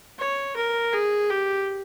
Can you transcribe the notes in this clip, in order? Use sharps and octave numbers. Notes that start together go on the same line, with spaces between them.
C#5
A#4
G#4
G4